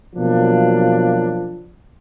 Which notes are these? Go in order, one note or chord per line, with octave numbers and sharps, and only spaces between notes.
B2 F3 F#3 A#3 D4